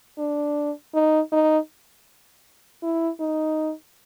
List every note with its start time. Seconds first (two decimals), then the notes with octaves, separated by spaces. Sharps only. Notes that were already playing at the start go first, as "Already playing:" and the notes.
0.18 D4
0.94 D#4
1.32 D#4
2.83 E4
3.20 D#4